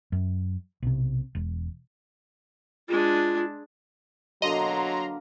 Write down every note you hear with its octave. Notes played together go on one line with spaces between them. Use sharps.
F#2
B1 C3
E1
G#3 D4 F4
B2 D3 F#3 A#3 D#5 A#5 C6
A#4